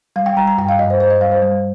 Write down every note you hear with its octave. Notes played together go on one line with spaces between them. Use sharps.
G3 F5
G5
G3 A#5
A#5
G2 G5
F5
G2 D#5
C5
G2 C5
D#5
G3 F5
C5
G3